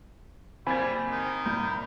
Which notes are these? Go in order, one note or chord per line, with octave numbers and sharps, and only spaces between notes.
F#1 G3 A#3 C4 G#5 B5 G#6
D#3 D#4
C2 G2 A#2 G6